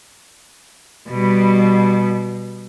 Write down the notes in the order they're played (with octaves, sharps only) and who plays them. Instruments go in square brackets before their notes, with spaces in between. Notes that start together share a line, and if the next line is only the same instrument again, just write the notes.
[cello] B2 G3